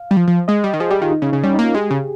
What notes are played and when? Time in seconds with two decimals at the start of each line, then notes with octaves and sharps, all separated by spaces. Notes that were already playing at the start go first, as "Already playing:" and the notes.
Already playing: F5
0.11 G3
0.17 F3
0.28 F3
0.48 G#3 D#5
0.64 G3
0.73 D#3
0.80 F3 G#4
0.91 G3 G4
1.01 D#3 F4
1.12 D#4
1.22 C#3
1.32 C#3 C#4
1.44 G3 C#4
1.54 A#3 D#4
1.64 F4
1.74 G#3 G4
1.91 C#3 G#4